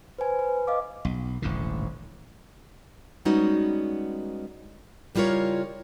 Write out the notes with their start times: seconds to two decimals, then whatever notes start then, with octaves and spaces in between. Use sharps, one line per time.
0.19 B4 C5 G#5
0.39 B4
0.67 D#5 F5 D6
1.05 B1
1.42 D#1 A1 G#2 D3
3.25 G3 G#3 B3 C#4 D#4 F#4
5.15 C#3 G3 E4 F4 A#4 C#5